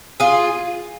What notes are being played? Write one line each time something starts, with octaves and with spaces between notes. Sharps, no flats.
F4 G#4